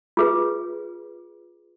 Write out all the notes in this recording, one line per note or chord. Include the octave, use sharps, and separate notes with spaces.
F4 G#4 B4